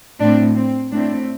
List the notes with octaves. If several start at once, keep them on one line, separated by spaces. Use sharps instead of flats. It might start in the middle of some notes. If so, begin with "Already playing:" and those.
A2 A3 C4 D4
C4
A2 A3 C4 D4